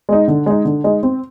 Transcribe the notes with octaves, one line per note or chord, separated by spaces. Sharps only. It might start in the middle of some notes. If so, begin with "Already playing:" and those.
G#3 D#4
D3
G#3 D#4
D3
G#3 D#4
C4